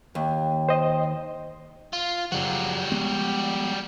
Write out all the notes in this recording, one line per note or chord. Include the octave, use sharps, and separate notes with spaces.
D#2 G5
C5 D#5
F4
F#2 C#3 F3 G3 F#4
F3 G#3 B3